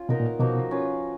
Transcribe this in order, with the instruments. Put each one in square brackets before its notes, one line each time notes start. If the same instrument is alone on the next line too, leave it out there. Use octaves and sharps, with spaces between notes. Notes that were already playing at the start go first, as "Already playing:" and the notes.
Already playing: [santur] C#4 F4
[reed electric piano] B2 [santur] B3 D#4 A#4 D#5
[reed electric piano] A#2
[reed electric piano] B2 [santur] F3 A#3 D#4 F#4
[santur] C#4 F4 B4